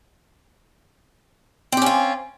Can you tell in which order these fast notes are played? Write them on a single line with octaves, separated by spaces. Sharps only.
C4 G4 C#4 F4